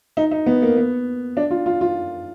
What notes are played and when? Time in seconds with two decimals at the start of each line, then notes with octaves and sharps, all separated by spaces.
0.17 D#4
0.31 D#4
0.46 B3
0.62 A#3
0.77 B3
1.37 D4
1.51 F4
1.66 F4
1.81 F4